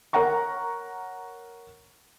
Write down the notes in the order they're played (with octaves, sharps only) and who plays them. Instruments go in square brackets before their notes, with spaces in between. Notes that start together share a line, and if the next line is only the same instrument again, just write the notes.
[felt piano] A#4 C#5 F#5 A#5 C#6